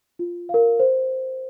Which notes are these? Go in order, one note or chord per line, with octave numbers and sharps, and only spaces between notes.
F4
A#4 F5
C5